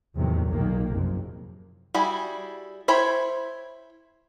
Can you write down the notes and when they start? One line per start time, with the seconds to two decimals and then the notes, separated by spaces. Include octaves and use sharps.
0.15 E2 A2 C3 D#3 F#3 G3
0.47 B1 A#2 D#3 A#3
0.89 F#1 F2 C3
1.94 G3 E4 F#4 G#4
2.88 E4 C5 C#5 G5 B5